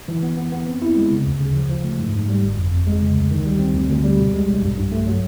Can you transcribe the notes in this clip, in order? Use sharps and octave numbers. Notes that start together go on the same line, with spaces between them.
E3
B3
B3
B3
C4
E4
G#3
C#3
D2
C#3
F3
F3
A3
G#2
G#2
G3
G1
F2
F2
G#3
C#3
D2
D#3
G3
C4
D2
D2
G3
B2
G#3
B1
G2
G2
A3
F#3